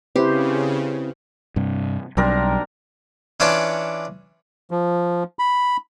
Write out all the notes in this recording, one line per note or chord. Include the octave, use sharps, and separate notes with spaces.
C#3 C4 E4 G4 B4 C5
G2 C3
B1 F#3 G3 C4 D4 A#4
E3 C#4 D4 F4 C#5 D5
F3
B5